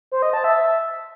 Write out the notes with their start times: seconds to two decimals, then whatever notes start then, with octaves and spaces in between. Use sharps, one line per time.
0.12 C5
0.22 D#5
0.33 A5
0.44 E5